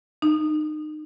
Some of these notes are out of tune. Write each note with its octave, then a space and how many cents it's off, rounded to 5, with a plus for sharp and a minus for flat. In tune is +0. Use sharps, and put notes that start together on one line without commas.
D#4 -30